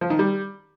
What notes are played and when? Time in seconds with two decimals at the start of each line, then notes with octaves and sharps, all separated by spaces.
0.01 F3
0.10 D#3
0.19 G3